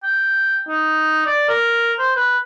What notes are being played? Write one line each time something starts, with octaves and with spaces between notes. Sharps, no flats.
G5
D#4
D5
A#4
C5
B4